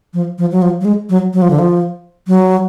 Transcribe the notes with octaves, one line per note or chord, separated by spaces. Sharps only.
F3
F3
F#3
F3
F#3
G#3
F#3
F#3
F3
D3
F3
F#3